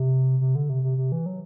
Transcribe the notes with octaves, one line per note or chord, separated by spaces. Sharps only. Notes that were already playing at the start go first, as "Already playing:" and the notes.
Already playing: C3
C3
D3
C3
C3
C3
E3
F#3